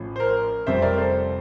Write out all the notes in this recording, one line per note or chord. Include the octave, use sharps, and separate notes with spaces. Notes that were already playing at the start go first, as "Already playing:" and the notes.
Already playing: A1 A2 F3
C5
A#4
F1 F2 C3 G3 C5 E5
A#4 D5
A4 C5